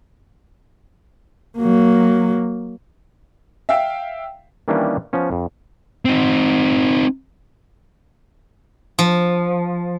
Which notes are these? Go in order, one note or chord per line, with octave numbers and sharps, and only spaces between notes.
F#3 A#3
E5 F5 G5
D#3 E3 G3 A#3 C#4 D4
F3 B3 C#4
F2
C4 D#4
F3